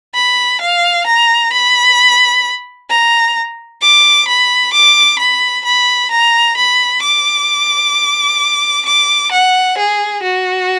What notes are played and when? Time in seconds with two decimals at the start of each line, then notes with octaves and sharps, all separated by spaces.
0.15 B5
0.61 F5
1.07 A#5
1.53 B5
2.90 A#5
3.82 D6
4.28 B5
4.73 D6
5.19 B5
5.65 B5
6.11 A#5
6.57 B5
7.02 D6
8.85 D6
9.32 F#5
9.78 G#4
10.23 F#4